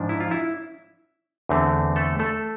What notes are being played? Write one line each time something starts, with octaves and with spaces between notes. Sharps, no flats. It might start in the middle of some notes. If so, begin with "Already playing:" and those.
Already playing: G#2 F3 D4
E4
F4
E4
E2 D3 A3 C4
A3 A4
A3 A4